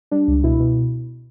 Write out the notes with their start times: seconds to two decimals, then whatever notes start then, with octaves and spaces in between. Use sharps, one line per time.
0.11 G3 D4
0.28 C#2
0.43 B2 E4
0.60 B2